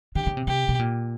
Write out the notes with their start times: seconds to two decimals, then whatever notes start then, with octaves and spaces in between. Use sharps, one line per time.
0.15 D3 G4
0.27 C#3
0.37 C3
0.47 C3 G4
0.69 B2
0.79 A#2